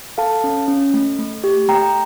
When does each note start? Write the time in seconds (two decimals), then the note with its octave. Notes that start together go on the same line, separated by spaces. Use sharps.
0.18 A4 F5 A5
0.44 C#4
0.68 C#4
0.94 A3
1.19 A3
1.44 G4
1.69 A3 G5 A#5